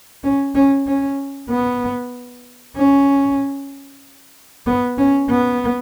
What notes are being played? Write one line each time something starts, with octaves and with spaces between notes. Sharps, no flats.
C#4
C#4
C#4
B3
C#4
B3
C#4
B3